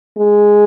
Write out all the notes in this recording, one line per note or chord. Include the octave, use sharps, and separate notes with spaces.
G#3